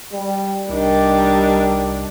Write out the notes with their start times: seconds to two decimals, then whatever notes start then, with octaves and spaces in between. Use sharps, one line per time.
0.12 G3
0.69 C2 D#3 G3 D4